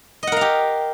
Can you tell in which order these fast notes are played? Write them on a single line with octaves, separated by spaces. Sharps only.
D#5 F#5 A#4 F5 G4